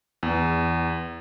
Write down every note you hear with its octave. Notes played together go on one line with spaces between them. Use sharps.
E2